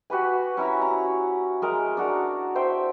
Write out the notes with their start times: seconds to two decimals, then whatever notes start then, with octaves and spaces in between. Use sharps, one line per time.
0.10 F#4 G4 B4 G#5
0.57 C#4 E4 E5 A#5
0.82 A#5
1.62 G#3 A#4
1.97 D4 F#4 A#4
2.55 C5 E5 G5